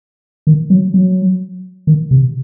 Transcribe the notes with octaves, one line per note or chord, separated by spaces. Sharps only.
D#3
F#3
F#3
D#3
C3